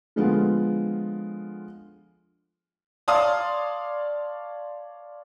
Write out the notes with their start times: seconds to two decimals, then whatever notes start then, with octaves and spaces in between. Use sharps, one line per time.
0.16 D3 F3 G#3 B3 F4
3.08 C#5 D5 F5 A5 C6 D#6